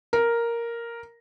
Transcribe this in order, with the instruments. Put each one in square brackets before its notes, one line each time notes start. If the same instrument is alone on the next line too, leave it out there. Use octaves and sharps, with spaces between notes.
[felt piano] A#4